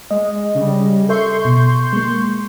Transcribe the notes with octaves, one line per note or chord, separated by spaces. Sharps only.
G#3 D#5
C#3 G3
A4 E5 C6 C#6 G6
B2
G#3 A#3